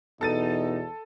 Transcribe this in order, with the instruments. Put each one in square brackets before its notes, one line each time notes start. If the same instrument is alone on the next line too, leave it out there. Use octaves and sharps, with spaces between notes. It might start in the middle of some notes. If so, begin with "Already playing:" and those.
[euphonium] E2 [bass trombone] B2 [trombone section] D#4 [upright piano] A4 A6 D#7